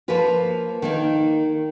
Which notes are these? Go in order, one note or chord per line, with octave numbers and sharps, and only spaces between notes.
F3 A#3 F4 B4
D#3 A#3 D#4